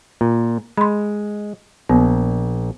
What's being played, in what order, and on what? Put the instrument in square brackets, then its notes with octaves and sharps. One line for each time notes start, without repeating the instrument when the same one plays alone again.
[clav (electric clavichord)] A#2
[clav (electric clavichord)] G#3 [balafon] B5 C6
[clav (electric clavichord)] A#1 [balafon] B3